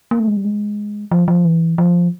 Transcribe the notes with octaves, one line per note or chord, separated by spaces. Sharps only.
A#3
A3
G#3
G3
G#3
F3
F3
E3
F3